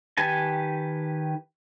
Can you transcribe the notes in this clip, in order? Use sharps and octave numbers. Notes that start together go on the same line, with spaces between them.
D#3 G4 B4 G#5 A5